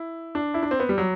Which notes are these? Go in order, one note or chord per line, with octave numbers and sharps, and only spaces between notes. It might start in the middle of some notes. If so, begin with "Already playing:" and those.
Already playing: E4
D4
E4
D4
C4
B3
G3
F#3